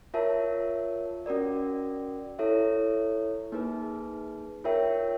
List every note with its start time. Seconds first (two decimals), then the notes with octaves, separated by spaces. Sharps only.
0.14 F4 A#4 C#5 E5 A5
1.26 C#4 F#4 A#4 D5
2.39 E4 A4 C#5 E5
3.52 A#3 D#4 G#4 B4
4.64 F4 A#4 C#5 E5 G5